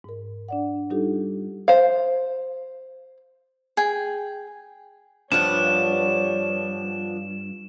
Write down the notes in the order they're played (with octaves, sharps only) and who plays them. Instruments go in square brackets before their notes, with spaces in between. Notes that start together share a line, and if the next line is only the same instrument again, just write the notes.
[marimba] G#2 A#4
D4 D5 F#5
G3 D4 D#4 F4 G4 A4
[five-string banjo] C5 F5
[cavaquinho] G#4 G5
[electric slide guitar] G2 [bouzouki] F3 B3 D4 [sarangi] C#5 [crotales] E7